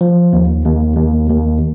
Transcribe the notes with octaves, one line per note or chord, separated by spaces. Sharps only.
F3
D#2
D#2
D#2
D#2